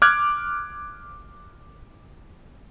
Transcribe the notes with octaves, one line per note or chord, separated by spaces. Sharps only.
D6 F6 F#6 G#6